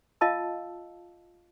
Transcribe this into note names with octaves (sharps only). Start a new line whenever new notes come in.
F4 D#5 F5 A5 E6